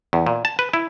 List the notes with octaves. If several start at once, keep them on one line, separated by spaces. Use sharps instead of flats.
E2
A#2
A5
B4
E4